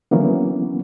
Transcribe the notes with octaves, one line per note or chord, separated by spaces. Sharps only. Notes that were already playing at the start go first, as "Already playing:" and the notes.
D3 E3 F#3 A#3 B3 C#4